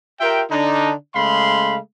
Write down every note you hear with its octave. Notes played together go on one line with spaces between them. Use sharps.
F4 G4 A#4 E5 G5
D3 D4 D#4
C#3 G#3 A3 F5 B5 C6